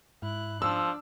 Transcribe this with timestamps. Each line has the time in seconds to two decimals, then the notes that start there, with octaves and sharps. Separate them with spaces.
0.22 G#2 E4 F#6
0.62 F3 D4 E6